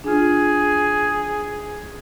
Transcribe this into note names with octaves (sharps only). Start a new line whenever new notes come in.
D4 F4 G#4